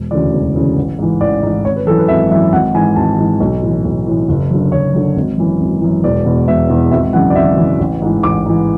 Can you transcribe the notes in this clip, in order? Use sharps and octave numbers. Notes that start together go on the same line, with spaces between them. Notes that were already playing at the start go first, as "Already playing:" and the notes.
Already playing: E1
D2 C#3 E3 D5
E1
D2 C#3 E3
A1
G#2 E3
A1 D5
G#2 E3
G#1 C#5
B4
F#2 E3 A4
B4
G#1 E5
F#2 E3 E5
G#1 F#5
G#2 E3 G#5
G#1 A5
G#2 E3
B1
A2
E3
B1
A2 E3
F#1
F#2 D3
F#1 C#5
F#2 D3
G#1
F#2 E3
G#1
F#2 E3
E1 D5
E2 B2
E1 E5
E2 B2
G#1 E5
F#2 C#3 E3 F#5
D5
G#1 E5
F#2 C#3 E3
A1
G#2 E3
A1 D6
G#2 E3